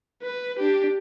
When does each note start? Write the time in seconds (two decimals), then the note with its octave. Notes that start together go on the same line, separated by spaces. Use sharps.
0.22 B4
0.59 D4 G4